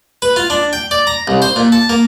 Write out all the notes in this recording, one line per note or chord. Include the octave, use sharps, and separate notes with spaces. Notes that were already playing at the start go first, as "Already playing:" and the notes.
B4
F4
D4
G5
D5
A#5
C2
C5
A#2
A5
A#3